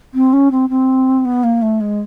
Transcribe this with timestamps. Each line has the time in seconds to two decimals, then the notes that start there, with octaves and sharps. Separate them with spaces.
0.14 C4
0.33 C#4
0.51 C4
0.69 C4
1.25 B3
1.44 A#3
1.62 A3
1.81 G#3